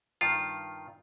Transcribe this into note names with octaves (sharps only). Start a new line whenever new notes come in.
G2 D#3 F4